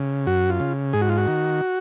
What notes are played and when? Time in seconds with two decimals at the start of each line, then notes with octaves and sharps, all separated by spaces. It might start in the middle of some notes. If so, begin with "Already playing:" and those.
Already playing: C#3
0.27 F#2 F#4
0.50 F4
0.60 C#3
0.93 G#2 G#4
1.01 F#4
1.09 F4
1.18 F#4
1.28 D#3